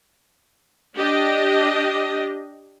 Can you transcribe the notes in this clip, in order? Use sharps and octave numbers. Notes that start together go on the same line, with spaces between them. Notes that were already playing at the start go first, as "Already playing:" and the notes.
D4 G4 D#5